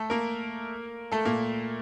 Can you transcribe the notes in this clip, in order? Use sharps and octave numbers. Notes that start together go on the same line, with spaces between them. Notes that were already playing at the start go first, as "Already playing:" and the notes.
Already playing: A3 A4
A#3 A#4
A3 A4
A#2 A#3